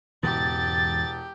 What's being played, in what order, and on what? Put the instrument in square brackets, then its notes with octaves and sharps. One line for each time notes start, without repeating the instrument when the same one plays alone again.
[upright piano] E1 [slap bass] E2 G#2 C#3 [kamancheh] G4 [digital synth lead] A6